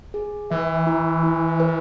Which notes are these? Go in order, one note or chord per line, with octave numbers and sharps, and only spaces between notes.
G#4
E3 E5
E4
E4
B4